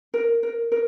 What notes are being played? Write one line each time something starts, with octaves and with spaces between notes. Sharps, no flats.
A#4
A#4
A#4